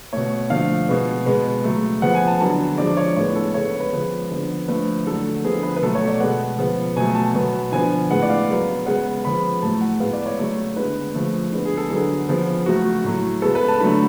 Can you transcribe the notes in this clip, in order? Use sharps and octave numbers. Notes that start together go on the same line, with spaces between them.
B2 A3 C#5
D3 F3 A3 F5
B2 G#3 B3
B2 G#3 B3
C#3 F#3 A3
C#3 F3 B3 F#5
G#5
A5
D3 F#3 B3 A5
D3 F3 G#3 D5
C#5
A2 G#3 B3 C#5
A4
C#3 G#3 B3 C#5
B4
C#3 F3 G#3 B3
D3 F3 B3
D3 F3 A3 B4
D3 F#3 A3 A4
D3 F3 B3 G#4
B4
B4
B2 F#3 A3 A4
C#5
D5
B2 G#3 B3 F#5
C#3 F3 B3
B2 F#3 A3 G#5
A5
B2 F#3 B3
D3 F3 B3 G#5
A2 G#3 B3 F#5
D5
F5
C#3 F#3 B3
C#3 G#3 B3 F#5
C#3 F3 B3 B5
A2 F#3 A3 A5
F#5
A2 G#3 B3 F5
D5
C#5
C#3 F#3 A3
D3 G#3 B3 B4
C#3 F3 A3
D3 G#3 B3
G#4
A4
D3 F#3 B3 G#4
C#3 F3 B3
C#3 F#3 A3 F#4
A2 F#3 A3
C#3 G#3 B3 A4
B4
A5
D3 F#3 A3 B5